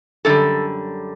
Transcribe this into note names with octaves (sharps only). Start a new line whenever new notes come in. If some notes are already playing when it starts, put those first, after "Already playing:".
F#2 D3 G3 A4